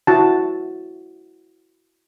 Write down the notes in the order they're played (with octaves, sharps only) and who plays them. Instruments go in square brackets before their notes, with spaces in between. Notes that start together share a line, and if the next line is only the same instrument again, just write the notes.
[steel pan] E4 F#4 A5